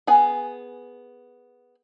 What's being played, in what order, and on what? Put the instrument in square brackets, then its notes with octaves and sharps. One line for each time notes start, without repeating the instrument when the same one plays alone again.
[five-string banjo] B3 G#4 G#5